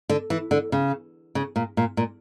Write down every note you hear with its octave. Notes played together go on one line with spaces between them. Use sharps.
D3
E3
D3
C#3
C#3
A#2
A#2
A#2